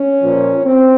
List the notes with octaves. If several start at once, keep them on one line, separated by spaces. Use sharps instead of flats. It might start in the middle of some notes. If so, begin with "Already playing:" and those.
Already playing: C#4
A#2 F3
C4